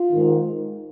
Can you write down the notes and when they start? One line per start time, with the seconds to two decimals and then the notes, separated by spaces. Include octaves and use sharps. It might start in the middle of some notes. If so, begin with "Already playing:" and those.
Already playing: F4
0.10 G#2 D#3